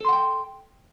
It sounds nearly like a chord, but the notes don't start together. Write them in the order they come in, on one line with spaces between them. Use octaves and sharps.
A4 C6 F#5 G5